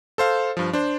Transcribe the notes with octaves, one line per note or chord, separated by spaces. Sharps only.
A4 C5 F5
G2 F3
D4 C5